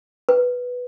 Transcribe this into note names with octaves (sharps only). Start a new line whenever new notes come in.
B4